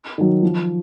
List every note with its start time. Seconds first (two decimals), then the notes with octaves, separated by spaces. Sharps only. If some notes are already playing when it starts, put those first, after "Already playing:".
0.18 D#3 F#3
0.43 F3